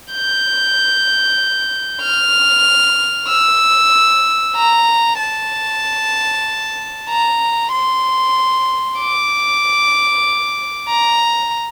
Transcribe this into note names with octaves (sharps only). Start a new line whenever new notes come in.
G6
F6
E6
A#5
A5
A#5
C6
D6
A#5